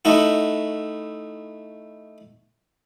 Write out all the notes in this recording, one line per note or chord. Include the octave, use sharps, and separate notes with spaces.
A3 D#4 E4 F#4